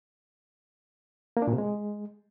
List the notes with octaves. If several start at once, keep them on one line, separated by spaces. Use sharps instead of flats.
A#3
D4
A#2
C3
G#3